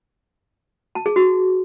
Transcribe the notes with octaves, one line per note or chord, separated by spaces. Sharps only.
A5
G#4
F#4